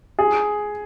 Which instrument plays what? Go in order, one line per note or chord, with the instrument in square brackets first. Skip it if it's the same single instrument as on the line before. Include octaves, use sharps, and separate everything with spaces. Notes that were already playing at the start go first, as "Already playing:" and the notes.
[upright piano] G#4